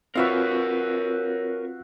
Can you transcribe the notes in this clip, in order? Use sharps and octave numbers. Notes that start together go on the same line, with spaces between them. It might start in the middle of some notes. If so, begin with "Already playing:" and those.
C4 F4 F#4 A#4 B4 C#5 E5 F5